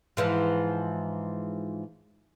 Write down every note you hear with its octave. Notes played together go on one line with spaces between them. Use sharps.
G#2 E3 F3